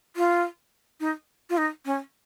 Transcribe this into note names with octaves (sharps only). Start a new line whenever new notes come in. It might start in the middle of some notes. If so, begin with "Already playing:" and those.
F4
D#4
F4
D#4
C#4